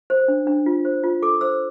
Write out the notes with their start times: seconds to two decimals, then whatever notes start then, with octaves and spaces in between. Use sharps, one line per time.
0.10 C5
0.28 D4
0.47 D4
0.66 F4
0.85 C5
1.03 F4
1.22 A4 D6
1.41 C5 E6